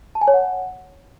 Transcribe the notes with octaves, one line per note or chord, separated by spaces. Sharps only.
A5
G#5
C#5
F#5